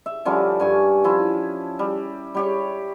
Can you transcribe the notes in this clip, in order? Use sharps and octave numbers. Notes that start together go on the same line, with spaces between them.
E5
D3 F3 G3 C#4
G2 G#5 C#6
F3 E4
G3
G3 G4 C#5